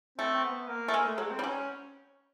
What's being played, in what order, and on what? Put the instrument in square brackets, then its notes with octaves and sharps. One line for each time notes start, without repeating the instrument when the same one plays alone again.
[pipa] A3 [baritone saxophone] C4
[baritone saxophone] C4
B3
A#3
[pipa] A3
[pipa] G#3 [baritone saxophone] A#3
[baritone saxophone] A3
[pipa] F#3 [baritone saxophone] G#3
[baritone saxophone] C4
[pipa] G3
[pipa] F#3 [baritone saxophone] C#4